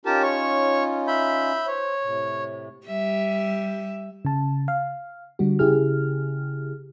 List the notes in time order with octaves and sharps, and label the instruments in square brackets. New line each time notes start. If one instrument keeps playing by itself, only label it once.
[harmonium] C#4 D#4 F4 [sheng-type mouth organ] G4 A#4 A5
[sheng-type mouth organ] C#5 C#6
E5 B5 G6
[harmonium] C5 [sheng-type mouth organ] C#5
[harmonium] A2 C3
[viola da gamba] G3 [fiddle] E5
[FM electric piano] C#3 A5
F5
D3 G3 F#4
C#3 E4 G4 G#4 F6